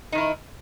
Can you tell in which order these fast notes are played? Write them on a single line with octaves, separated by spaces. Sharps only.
D#4 D#3 E4